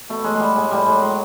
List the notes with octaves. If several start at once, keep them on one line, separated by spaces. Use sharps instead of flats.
B2 A3
F#3 G#3
B2 G3 G#3
A2 G#3
A2 G3
A2 G#3
F#3 G#3